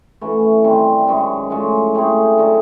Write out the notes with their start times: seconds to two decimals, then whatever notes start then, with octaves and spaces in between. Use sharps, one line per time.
0.21 E3 A3 C#4 F#4
0.64 C3 D#3 G3 C4
1.07 F#2 D#3 G#3 C#4
1.50 A2 F3 G#3 C#4
1.95 A3 C4 E4 G#4
2.38 D3 F#3 A#3 D#4